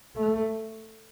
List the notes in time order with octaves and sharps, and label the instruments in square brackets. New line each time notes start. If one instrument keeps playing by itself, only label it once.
[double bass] A3